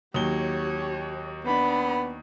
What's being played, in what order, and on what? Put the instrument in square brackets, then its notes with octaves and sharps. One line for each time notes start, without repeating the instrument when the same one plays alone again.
[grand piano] D#2 F#3 G7 [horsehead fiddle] G4 C#5
[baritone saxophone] B3 [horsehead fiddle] D4 B5